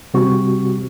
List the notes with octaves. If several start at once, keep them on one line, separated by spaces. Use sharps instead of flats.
C3 G3 C4 F#4 G4 C#6